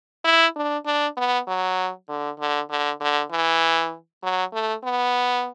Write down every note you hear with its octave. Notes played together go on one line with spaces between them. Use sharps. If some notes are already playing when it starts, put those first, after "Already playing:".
E4
D4
D4
B3
F#3
D3
D3
D3
D3
E3
F#3
A3
B3